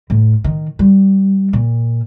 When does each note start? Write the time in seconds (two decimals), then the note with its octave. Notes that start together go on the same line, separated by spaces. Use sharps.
0.10 A2
0.44 D#3
0.79 G3
1.53 A#2